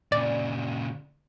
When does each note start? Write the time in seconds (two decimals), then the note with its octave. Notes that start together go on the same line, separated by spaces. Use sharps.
0.12 A#2 C#3 D5